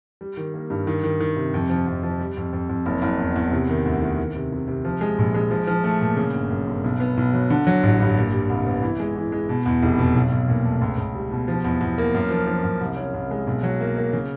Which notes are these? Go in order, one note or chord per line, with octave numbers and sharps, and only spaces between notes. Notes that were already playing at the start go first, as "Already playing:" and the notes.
G3
D#3
A#3
G2
D#3
D#3
D#3
C3
F2
F3
F2
F3
G3
F2
F2
F2
F#1
F#1
E2
E2
C3
D#3
D2
D#3
D#3
C3
C3
C3
F3
G#3
A#1
G#3
F3
F3
A3
A#2
C#3
G1
F#2
G1
B1
B3
B1
F#3
D3
F#3
A1
G2
A#2
G3
C2
B3
E3
G#3
E3
G#3
B2
E2
F1
B2
B1
B1
A#2
A3
C#2
C#2
G3
B2
F3
E2
E2
A#3
F#2
F3
F3
F#2
C2
C#4
C2
G#3
B1
F#3
A#3
A#3
C#3